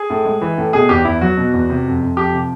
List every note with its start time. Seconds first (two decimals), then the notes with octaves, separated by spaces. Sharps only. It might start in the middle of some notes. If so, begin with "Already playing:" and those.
Already playing: G#4
0.10 A2
0.25 G#3
0.41 E3
0.58 A2
0.73 B2 G#4
0.89 E2 G4
1.05 E2 E4
1.21 F#3 F#4
1.37 B2
1.53 E2
1.70 C3
1.86 F2
2.01 F2
2.17 F3 G4
2.33 C3